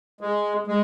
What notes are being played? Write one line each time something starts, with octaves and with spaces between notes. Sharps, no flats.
G#3
G#3